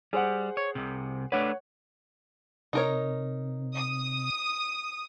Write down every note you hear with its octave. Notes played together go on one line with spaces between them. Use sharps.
G3 G#4 C5 F#5
C#5
C2 C3
A3 D4 B4 C#5 F#5
C3 D#4 A#4 C#5
D#6